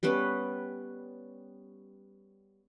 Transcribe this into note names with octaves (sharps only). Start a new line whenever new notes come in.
G3 B3 C#4 B4